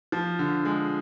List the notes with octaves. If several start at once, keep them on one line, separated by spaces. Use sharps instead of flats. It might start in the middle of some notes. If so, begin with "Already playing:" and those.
F3
D3
G#3